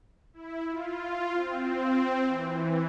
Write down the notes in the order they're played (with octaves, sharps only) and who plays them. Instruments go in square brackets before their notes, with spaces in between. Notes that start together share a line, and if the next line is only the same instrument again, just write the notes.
[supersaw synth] E4
F4
C4
E3